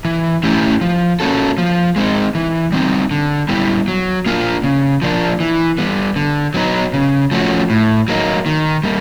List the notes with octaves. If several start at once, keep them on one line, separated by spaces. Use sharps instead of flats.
E3
A3 C#4 E4 G4
F3
A#3 C#4 F#4 A4
F3
G#3 C4 D#4
E3
G3 C4 D#4
D3
G3 B3 E4 G4
F#3
A#3 D4 F4
C#3
F3 A#3 D4
E3
G3 B3
D3
F#3 B3 D#4
C#3
F3 A3 C#4 F#4
A2
F#3 A#3 D#4
D#3
G3 A#3